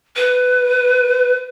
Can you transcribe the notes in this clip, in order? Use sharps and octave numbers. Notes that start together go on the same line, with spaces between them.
B4